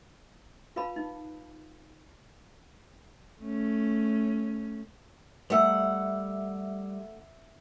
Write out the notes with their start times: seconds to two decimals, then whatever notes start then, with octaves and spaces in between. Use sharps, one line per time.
0.76 F4 B4 F5 A5 B5
0.96 D#4
3.42 A3 C#4
5.50 G3 A3 A#4 E5 F#5 E6